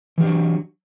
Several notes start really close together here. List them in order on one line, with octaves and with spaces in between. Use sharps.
E3 G4 D4 F#3